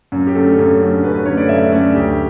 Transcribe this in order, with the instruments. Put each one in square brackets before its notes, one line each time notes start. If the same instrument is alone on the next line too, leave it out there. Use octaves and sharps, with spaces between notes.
[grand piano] F#2
G4
D3 A3 C#4 A4
F#2
D3 A3 C#4
F#2 B4
B4
D3 A3 C#4 C#5
D5
F#2 E5
D3 A3 C#4 D5
D2 G4